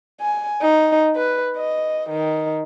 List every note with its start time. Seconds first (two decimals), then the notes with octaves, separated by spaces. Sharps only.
0.21 G#5
0.62 D#4
1.16 B4
1.57 D#5
2.10 D#3